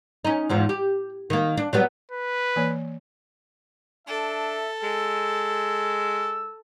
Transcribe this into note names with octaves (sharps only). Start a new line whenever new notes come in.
C#4 D#4
E2 G#2 F3
G4
D#3 A#3
D4
F#3 G3 B3
B4
E3 A#3 C#5
D4 A4 E5
G#3 E6